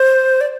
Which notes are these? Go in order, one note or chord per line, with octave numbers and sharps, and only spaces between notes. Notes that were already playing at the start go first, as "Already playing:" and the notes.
Already playing: C5
D5